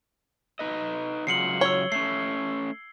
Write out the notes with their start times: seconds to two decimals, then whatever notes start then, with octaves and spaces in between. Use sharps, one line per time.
0.59 D#4 B4 D#5
1.27 C#3 F#3 F4 C7 C#7 F#7
1.61 C#5 E6 G#6 G7
1.92 A3 C#4 C7